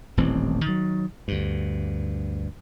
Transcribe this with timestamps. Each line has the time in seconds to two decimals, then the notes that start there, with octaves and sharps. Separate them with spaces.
0.17 D#1 A1 E3 C4
0.66 D#3 F#3
1.28 D2 G2